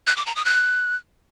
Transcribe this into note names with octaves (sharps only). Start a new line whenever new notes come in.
F#6
D6
A#5
D#6
F#6